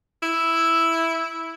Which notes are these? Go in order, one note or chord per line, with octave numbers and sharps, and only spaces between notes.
E4